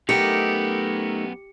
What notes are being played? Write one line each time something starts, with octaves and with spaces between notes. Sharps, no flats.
F#2 A3 B3 D#4 G4 A#4 C#7